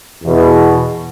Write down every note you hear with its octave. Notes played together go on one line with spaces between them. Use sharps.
E2 B2